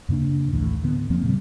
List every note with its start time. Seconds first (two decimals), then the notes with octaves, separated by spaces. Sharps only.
0.09 F#2 C#3 A#3 D4
0.51 A#1 D#2 A2 E3
0.82 A2 D3 B3
1.10 E2 F3 A#3 C4
1.24 A#2 C#3 F#3 G3